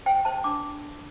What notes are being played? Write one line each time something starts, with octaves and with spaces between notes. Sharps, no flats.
C5 G5
C5 A5
D4 D6